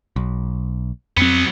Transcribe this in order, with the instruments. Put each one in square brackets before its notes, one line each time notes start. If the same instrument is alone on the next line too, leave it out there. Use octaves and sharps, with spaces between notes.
[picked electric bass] B1
[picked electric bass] F2 C4 [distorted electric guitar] F#3 B3